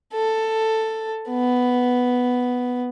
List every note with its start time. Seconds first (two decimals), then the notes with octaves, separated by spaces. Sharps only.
0.14 A4
1.30 B3